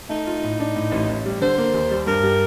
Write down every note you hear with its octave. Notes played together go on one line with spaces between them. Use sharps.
A3 D#4
F4
A2
D4
A2
A1
A1
G3
D3 C5
A#3
D#2
G3
G2 A#4
G3